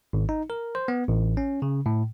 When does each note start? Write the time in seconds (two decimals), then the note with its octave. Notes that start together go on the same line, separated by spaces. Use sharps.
0.13 G#1
0.29 D#4
0.50 A#4
0.75 C5
0.88 B3
1.08 A1
1.37 C#4
1.62 C#3
1.86 A2